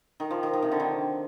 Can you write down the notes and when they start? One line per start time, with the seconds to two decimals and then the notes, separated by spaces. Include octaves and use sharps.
0.20 D#3
0.30 F3
0.43 D#3
0.53 D#3
0.62 C3
0.71 D3
0.80 D#3